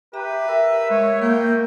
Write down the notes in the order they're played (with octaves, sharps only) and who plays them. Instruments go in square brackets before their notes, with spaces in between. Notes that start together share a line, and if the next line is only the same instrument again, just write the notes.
[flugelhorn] G4 [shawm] B4 [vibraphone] E5 A#5
[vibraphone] A#4 [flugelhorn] E5
[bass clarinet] G#3 [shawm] C#5
[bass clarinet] A#3 [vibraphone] A#4 [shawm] G5